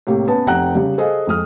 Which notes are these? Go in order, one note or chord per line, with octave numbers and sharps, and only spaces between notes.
A2 C3 A#3 G4
B3 C#4 B4 A5
F1 C3 F#5 G5 A#5 F#6
C#3 G3
G#4 A4 C5 D#5 F5 G#5
F2 G#3 D#6 F6